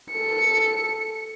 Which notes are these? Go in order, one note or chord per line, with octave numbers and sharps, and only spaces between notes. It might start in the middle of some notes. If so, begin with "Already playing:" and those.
A4 C#7